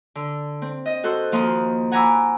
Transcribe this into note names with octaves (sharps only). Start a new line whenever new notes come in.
D3
C4
D#5
F#4 A4 C5
D#2 F3 A#3 F5 C6 D#6
F#5 G#5 A#5 B5 D6 E6